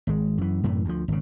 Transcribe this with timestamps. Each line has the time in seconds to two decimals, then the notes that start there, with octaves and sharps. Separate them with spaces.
0.07 G#1 G#3
0.38 F#2 E3
0.64 F#2 A2 C3 E3
0.85 D2 F3
1.08 G#1 C#3